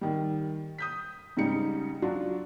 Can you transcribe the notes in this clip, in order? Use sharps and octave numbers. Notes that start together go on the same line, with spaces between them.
D#3 G3
D#6 G6 B6
G#2 C#3 G3 D#4 C#7
F#3 D4 F4 F#4